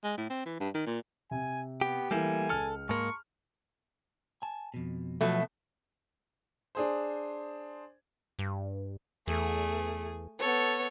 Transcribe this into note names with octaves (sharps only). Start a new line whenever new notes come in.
G#3
A2
C4
E3
G2
D#3
A#2
C3 G#5
B3 G4
E3 G3 A3 A#3 E4 G#5
C#2 A4 F6 C#7
G#2 A#3 A5 A#5 C6 C#6
G#5 A5
F2 B2
B2 F3 F#3 A3 B3
D4 G#4 C5
G2
E2 A3 G#4
B3 A4 C#5